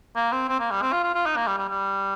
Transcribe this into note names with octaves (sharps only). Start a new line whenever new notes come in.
A#3
C4
C4
A#3
G3
C4
F4
F4
F4
D#4
A#3
G3
G3
G3